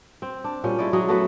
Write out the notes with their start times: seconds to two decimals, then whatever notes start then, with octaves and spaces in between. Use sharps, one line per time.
0.22 C4
0.44 D4
0.64 A#2 G3 C#4
0.79 G#3 E4 C#5 D5
0.93 F#3 G#3 C#4 G#4
1.09 A3 B3 F#4 A4